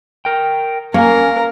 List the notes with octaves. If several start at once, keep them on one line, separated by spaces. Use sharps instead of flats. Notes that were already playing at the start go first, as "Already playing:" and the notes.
A#4 G5
A#3 C#4 D4 A#4 F5 G#5